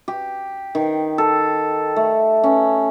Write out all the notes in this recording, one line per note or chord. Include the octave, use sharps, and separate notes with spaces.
G4
D#3
A4
A3
C#4